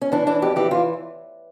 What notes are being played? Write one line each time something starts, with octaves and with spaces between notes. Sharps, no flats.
C#4
E3 D4
E3 D4
F2 G4
E3 G4
E3 F4